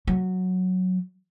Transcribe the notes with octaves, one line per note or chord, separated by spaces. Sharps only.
F#3